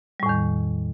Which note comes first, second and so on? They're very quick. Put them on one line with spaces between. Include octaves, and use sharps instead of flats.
G3 A2 E2 D#3